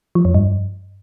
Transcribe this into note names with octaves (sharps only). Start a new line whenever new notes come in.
F3
F2
G2